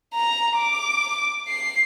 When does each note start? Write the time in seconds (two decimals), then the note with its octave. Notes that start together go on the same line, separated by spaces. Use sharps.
0.14 A#5
0.56 D6
1.48 C7